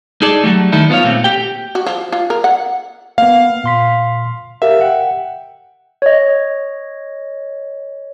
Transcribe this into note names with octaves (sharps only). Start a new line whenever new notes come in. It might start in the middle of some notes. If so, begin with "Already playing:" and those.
D#4 G#4 A4 D5
F#3 G3 A3
D#3 G3 D#4 E4 A4
B3 F4 C5 C#5 F5
A#2 A3 C4
G4 G5
F#4
F3
F4
A#4
F#5
A#3 B3 F5
A#2 C6 B6
G4 A#4 E5 F5
F#5 G5
C#5 D#5